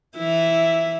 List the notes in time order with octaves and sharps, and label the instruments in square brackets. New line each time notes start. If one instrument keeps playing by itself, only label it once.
[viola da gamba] E3 E4